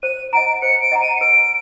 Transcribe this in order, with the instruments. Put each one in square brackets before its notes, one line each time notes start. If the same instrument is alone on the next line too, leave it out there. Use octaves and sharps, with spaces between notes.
[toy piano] C5 [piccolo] D#7
[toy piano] D#5 F#5 A#5 [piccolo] D7
[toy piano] C5 [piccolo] C#7
[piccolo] D7
[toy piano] D#5 F#5 A#5
[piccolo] D#7
C#7
[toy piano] B4 [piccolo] D7